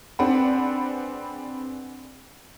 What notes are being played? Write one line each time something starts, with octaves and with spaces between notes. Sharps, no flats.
C4 D4 G#4 B4 F#5 B5